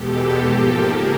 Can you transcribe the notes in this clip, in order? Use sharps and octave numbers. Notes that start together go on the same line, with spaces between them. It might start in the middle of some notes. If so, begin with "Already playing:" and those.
Already playing: E2 B2 G#3 G4 A4
G#2 F3 A#3
C#3 G#4 A#4